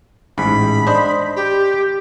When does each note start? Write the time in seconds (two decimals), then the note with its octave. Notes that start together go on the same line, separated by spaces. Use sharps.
0.38 A1 G#2 B5
0.87 D4 C5 D#5
1.36 G4